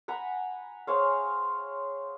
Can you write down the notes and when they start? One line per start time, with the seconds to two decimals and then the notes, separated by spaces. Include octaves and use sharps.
0.08 F#5 G#5 A#5 B5
0.87 G#4 C5 C#5 F5